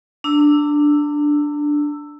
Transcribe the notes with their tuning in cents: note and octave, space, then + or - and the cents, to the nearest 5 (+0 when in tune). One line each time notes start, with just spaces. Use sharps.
D4 +0 A#5 -45 E6 +0